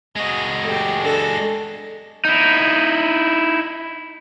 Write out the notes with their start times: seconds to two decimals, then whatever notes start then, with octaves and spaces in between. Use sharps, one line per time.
0.16 G#3 F#4 D#5
0.64 A3 G4
1.02 D4 A4
2.25 D#4 E4